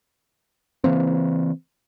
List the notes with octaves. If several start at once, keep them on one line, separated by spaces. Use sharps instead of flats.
C#3 E3 A#3 C4